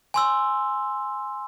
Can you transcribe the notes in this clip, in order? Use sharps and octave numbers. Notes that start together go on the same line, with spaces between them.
G#5 C6 E6